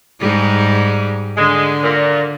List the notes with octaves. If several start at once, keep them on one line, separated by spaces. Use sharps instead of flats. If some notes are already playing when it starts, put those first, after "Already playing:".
G#2 G3 G#3
D3 G#3
A#2